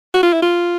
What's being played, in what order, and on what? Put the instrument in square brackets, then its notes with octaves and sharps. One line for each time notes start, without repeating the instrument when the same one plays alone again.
[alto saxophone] F#4
F4
E4
F4